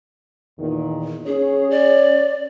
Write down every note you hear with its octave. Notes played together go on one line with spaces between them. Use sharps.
E2 A#2 D#3
C#4 G#4 C#5
D5